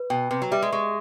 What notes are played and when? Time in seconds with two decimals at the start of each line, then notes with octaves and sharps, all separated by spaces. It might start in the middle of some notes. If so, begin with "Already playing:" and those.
Already playing: B4
0.10 B2 G5
0.30 C3 B4
0.42 F#3
0.52 G3 E5
0.62 G#3
0.72 G#3 C#6